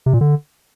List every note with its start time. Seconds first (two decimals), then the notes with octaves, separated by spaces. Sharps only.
0.06 C3
0.13 A#2
0.21 D3